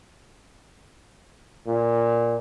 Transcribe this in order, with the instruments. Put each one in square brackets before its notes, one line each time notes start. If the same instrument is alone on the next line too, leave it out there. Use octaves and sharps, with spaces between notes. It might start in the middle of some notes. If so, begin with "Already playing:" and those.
[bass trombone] A#2